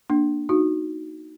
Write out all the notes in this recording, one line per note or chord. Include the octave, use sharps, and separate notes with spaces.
A#3 D4
D#4 F#4